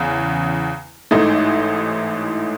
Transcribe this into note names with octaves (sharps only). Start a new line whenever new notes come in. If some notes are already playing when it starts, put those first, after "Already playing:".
Already playing: E2 C#3
A1 G#2 E3 A3 D#4